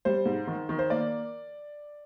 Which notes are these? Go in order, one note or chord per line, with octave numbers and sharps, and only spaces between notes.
G3 C5
G#2
D#3
D#3
C5
A#3 D5